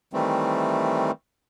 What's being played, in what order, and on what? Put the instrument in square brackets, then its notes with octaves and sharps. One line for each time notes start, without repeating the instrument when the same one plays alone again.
[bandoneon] D#3 E3 G3 A3 C4